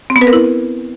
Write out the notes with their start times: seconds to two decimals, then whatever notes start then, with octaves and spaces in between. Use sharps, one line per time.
0.10 C4
0.16 B3
0.21 B4
0.27 A#4
0.33 E4